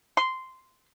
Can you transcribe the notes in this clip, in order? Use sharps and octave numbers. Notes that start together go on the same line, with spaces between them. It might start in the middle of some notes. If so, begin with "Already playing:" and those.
C6